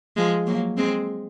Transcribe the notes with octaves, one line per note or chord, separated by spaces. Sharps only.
F3 G#3
F#3 A#3
G#3 C4